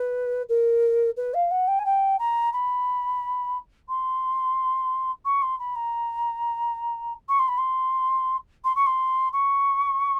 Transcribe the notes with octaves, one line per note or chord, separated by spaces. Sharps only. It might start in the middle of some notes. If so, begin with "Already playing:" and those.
Already playing: B4
A#4
B4
F5
F#5
G5
G#5
G5
A#5
B5
C6
C#6
C6
B5
A#5
C#6
C6
B5
C6
C6
C#6
C6
C#6